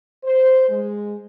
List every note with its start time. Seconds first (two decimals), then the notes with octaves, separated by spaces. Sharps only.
0.25 C5
0.69 G#3